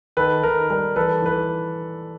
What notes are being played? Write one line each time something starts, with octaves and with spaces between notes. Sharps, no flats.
D#3 A4 B4
D#3 A#4
G3 A#4
E3 A4 B4
E3 B4